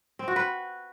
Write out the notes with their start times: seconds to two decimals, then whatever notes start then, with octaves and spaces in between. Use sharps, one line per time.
0.19 C4
0.28 F#4
0.36 B4